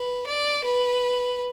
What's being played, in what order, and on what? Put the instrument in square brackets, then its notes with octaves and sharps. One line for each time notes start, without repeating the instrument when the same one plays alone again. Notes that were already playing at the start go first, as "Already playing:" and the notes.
Already playing: [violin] B4
D5
B4